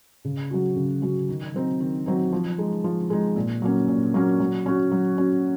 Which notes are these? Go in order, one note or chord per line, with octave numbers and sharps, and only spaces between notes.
C#3
F#3 C#4 F#4
C#3
F#3 C#4 F#4
D#3
F#3 C4 D#4
D#3
F#3 C4 D#4
F3
G#3 D#4
F3
G#3 D#4
A#2
F#3 A#3 C#4
A#2
F#3 A#3 C#4
F#3
C#4 F#4
F#3
C#4 F#4